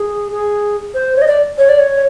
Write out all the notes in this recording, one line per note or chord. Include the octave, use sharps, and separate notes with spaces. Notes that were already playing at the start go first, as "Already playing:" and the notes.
Already playing: G#4
G#4
C5
C#5
D#5
D5
C#5
D5
C#5